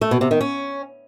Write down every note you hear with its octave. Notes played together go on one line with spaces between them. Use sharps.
A3
B2
C3
D#3
C#4